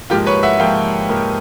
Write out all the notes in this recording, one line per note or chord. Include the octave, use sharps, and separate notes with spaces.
G#2 F3 A#3 F4 G4
B4 C#5
E5 F#5
G#2 F3 A#3 F5 G5
G#2 F3 A#3